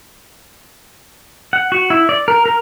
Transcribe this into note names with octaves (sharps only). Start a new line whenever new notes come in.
F#5
F#4
E4
D5
A#4
A#4